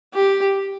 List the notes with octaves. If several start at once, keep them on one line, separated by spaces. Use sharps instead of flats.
G4